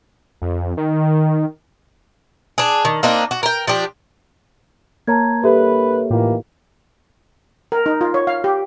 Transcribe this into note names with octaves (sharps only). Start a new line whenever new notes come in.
F2
D#3
D4 G#4
D#3
A#3 C4 D4 D#4
F#4
A#4 G5
F3 D4 G4
A#3 A#4 C#5 A5 A#5 G#6
G2 G4 A4 B4 E5
A2 D#3 E3 A#3 F4 G4
A#4
D#4
F4
C#5
F5
G4